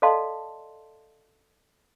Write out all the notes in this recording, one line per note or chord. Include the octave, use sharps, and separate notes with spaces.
A4 D5 D#5 F5 A5 C6